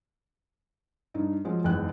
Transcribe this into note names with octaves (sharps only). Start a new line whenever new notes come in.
G2 D#4
F3 F#3 G#3 C#4
F#1 E2 G#2 G5 F#6